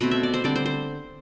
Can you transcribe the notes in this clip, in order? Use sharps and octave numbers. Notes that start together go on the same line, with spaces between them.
B2 A3 C4 B5
E5
D5
C5
D3 G3 C4 D5
C5
C5